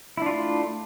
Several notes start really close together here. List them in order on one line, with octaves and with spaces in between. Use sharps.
E4 D4 F4 A3